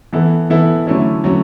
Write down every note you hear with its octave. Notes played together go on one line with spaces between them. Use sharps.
E3 B3 E4 A4
E3 B3 E4 A4
D3 F#3 A3 C#4 E4
D3 F#3 A3 C#4